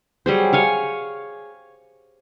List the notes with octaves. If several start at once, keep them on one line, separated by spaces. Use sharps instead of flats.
F#3 G3 G#4 C5
C#5 F5 G#5